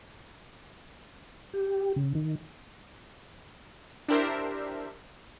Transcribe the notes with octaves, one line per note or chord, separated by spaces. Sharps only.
G4
C#3
D#3
D4 E4 G4 A#4 C5 E5